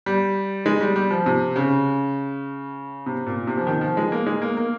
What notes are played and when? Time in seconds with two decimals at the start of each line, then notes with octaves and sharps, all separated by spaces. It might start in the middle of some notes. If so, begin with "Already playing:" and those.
0.06 G3
0.66 G#3
0.81 G3
0.96 G3
1.11 F3
1.26 C3
1.56 C#3
3.06 C3
3.26 A#2
3.47 C3
3.57 F3
3.67 D#3
3.81 F3
3.97 G#3
4.12 A#3
4.26 G#3
4.42 A#3
4.57 A#3